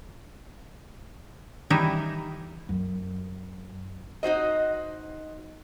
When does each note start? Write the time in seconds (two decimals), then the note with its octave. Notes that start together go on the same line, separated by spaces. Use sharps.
1.70 D#3 E3 G3 D#4 E4
2.69 F#2
4.23 D#4 F#4 C5 D#5